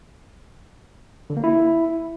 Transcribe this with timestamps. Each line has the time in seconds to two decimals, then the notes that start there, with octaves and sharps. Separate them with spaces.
1.30 D3
1.37 A#3
1.44 E4